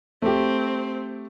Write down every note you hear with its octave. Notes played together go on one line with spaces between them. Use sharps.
A3 C4 G4